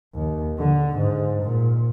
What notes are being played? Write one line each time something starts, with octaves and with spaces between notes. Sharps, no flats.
D#2
D3
G#2
A#2